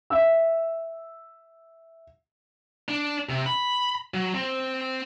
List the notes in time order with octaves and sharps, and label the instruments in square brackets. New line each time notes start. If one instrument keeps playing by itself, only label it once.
[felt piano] E5 E6
[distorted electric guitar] D4
C3
B5
F#3
C4